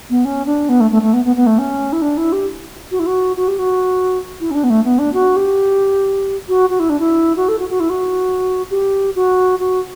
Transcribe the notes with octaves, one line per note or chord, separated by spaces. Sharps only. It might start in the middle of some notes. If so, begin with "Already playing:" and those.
B3
C#4
D4
B3
A3
A3
A3
B3
B3
B3
A3
C#4
E4
D4
E4
G4
F#4
E4
F#4
F#4
G4
F#4
E4
C#4
D4
B3
A3
B3
D4
F#4
G4
F#4
F#4
E4
D4
E4
F#4
A4
F#4
F#4
E4
F#4
G4
F#4
F#4